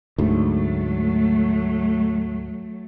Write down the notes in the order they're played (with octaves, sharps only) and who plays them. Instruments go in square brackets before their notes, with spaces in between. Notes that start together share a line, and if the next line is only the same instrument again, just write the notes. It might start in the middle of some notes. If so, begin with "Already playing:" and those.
[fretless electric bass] D2 G#2 [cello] F#3 A3